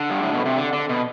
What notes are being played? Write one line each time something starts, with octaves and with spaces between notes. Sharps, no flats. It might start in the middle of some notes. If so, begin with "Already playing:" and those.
Already playing: D3
G2
A2
B2
C3
D3
D3
B2